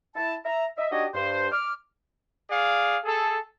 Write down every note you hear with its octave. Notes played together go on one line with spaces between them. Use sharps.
E4 A5
E5 A#5
D#5 E5
D4 D#4 F#4 G4 C#5 D#5
G2 C5
D6 F6
G#4 D5 F5
G#4 A4